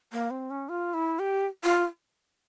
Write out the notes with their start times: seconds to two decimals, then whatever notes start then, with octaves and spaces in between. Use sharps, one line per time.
0.12 A#3
0.31 C4
0.50 C#4
0.69 F4
0.94 E4
1.19 G4
1.64 F4